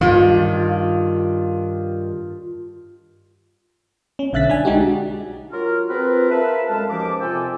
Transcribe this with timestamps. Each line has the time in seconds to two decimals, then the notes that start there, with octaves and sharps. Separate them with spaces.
0.01 G2 D#3 F4
4.19 C#4
4.33 B1 D3 E5 F#6 A6 B6
4.50 D4 G#5
4.65 G#3 D#4 F#4 G4
5.52 F#3 F4 F#4 A#4
5.90 C4 F4 G#4 A#4 B4
6.31 A#4 B4 E5 F5 A5
6.69 F#2 G#3 A4 F5 A5
6.90 D#2 F3 C#4 D6
7.21 F2 C3 F4 A4 G5 G#5